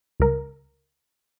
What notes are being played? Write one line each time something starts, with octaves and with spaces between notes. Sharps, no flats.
C#2 A#4